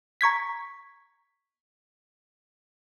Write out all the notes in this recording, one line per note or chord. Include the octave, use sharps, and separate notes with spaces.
A#5 C#6 G#6 B6